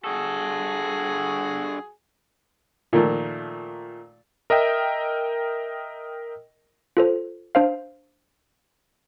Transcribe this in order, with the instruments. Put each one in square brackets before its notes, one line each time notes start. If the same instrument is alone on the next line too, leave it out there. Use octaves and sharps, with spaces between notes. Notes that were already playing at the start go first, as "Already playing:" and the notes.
[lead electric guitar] G2 A4 [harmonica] F#4 G#4
[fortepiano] A#2 D#3 F3 A3
[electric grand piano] A#4 D#5 E5 G5
[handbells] F4 A4 C5
D4 C5 F5